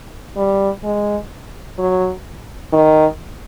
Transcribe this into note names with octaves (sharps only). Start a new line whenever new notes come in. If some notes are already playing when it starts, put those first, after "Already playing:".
G3
G#3
F#3
D#3